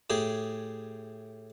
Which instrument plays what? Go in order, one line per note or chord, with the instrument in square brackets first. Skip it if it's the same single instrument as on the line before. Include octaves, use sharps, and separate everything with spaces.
[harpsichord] A2 G4 G#4